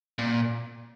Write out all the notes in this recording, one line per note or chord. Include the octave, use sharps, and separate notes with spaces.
A#2